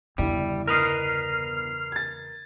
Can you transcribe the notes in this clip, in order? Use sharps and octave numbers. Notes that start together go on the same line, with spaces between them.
G1 E2 C#3 G3 E4
A#4 B4 D#5 F6 C7
G#6 A6